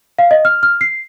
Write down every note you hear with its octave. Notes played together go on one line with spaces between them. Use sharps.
F5
D#5
F6
F6
C7